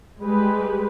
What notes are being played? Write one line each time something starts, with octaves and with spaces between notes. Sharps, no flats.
G3 G#3 G4 B4